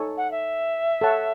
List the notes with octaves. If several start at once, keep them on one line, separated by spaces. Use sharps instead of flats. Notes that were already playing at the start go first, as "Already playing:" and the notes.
Already playing: D#4 A4 C#5 G#5 C#6
F#5
E5
A4 C#5 F#5 A5